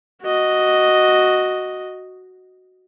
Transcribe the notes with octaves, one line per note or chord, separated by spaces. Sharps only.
F#4 D#5